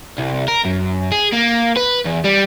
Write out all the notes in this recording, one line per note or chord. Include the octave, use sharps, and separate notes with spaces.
C2
A#4
F#2
G#4
A#3
B4
E2
G3